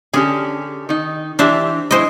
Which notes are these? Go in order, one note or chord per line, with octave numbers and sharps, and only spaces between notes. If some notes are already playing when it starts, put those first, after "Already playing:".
D3 C#4 G4 G#4
D#3 D#4
E3 D4 G4 C5 E5
F#3 G#3 E4 C5 D#5